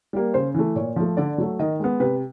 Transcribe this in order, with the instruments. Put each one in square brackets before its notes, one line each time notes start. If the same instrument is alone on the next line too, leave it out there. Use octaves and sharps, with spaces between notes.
[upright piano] G3 A#3
C#3 C5
E3 A3
A#2 C#5
F3 A3
D3 D5
F#3 A3
D#3 D#5
G#3 B3
C3 B4